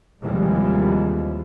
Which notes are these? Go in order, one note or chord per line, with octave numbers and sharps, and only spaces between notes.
D#2 C3 E3 F3 G3 G#3